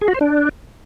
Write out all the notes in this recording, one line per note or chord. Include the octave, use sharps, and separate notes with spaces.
G#4
F#4
C5
D4